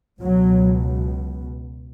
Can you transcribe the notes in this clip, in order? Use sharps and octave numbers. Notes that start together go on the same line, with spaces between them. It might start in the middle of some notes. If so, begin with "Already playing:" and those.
C#2 B2 F#3